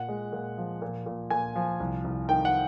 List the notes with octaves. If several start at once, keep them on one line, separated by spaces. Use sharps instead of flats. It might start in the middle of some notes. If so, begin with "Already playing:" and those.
Already playing: A#2 F#5
G#3
A#2
F3
A#2
A#2
A#2 G#5
F3
C2
C2
D#3 G5
F#5